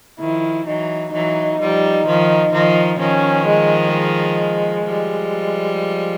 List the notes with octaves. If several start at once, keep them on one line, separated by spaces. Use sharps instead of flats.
D#3 F3 E4
E3 F#3 D#4
E3 F#3 D#4
F3 G3
D#3 F3
D#3 F3
D#3 F3 C#4
G#3
G#3
F3 G3
G#3